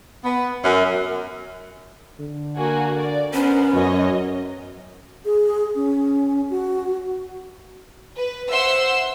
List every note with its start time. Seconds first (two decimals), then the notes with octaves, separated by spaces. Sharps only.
0.24 B3
0.64 F#2
2.20 D3
2.58 A#3 F#4 G#5
2.94 D5
3.33 B3 C#4 A#4 C5
3.73 F#2 C#5 D#5
5.25 G#4
5.75 C#4
6.50 F#4
8.16 B4
8.51 C5 E5 F#5 C6 E6